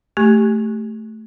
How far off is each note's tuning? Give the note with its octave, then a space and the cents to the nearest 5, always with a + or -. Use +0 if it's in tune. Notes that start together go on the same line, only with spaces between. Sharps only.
A3 +0 G4 +0 C#6 -20